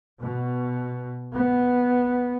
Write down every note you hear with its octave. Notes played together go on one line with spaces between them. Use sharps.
B2
B3